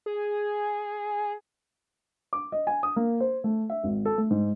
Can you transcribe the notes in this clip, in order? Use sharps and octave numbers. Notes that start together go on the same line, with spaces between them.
G#4
D6
D#5
G#5
D#6
A#3
C5
A3
E5
G#1
A4
A3
G#2